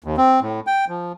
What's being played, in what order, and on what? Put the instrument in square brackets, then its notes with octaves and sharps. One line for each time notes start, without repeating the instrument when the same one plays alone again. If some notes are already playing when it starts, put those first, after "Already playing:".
[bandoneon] D#2
C4
A2
G5
F3